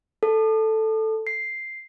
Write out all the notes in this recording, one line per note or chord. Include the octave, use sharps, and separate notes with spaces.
A4
C7